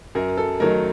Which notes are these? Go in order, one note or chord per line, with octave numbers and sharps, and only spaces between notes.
F#2 A#4
A4
D#3 F#3 A3 A#4